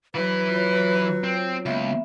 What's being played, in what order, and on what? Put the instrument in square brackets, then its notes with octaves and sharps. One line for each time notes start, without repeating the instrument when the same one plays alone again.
[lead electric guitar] E3 E4 [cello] F#3 [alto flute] B4
[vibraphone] F4 C#5
[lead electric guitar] C4
[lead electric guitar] C#2 [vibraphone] A#3 B3 E5